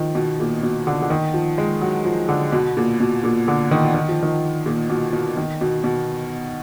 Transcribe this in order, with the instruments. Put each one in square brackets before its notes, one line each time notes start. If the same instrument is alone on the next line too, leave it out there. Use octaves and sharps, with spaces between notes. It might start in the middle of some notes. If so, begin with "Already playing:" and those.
Already playing: [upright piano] D#3 F3
B2
A#2
B2
D3
D3
D#3
F3
G#3
F#3
F3
D3
B2
A#2
B2
A#2
D3
D#3
D#3
F3
D#3
A#2
B2
B2
D#3
B2
B2